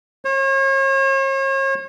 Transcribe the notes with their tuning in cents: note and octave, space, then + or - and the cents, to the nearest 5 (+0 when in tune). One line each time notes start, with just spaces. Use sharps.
C#5 -40